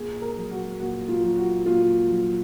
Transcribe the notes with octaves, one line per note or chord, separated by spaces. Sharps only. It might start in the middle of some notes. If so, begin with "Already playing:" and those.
Already playing: A#2 G#4
A#4
F#3
F#4
A#2 F#4
F4
F#3
F#4
A#2 F4
F#3